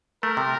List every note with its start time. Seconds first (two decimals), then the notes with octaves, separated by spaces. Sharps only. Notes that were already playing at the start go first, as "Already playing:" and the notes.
0.23 A3 A#4
0.37 C3